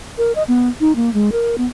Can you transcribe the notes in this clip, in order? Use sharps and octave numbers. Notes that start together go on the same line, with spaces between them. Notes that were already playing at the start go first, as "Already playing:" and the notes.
A#4
D#5
B3
D#4
A#3
G#3
A#4
B3